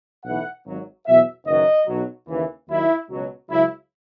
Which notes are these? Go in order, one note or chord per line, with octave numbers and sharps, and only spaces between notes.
B1 A2 E3 F#5
G#1 G#2 F#3
E2 B2 F#3 E5
F#1 F#2 D#3 F#3 D#5
B1 B2 F#3
D#2 C#3 E3
D#2 D#3 F#3 E4
C#2 B2 F#3
C#2 C#3 F#3 E4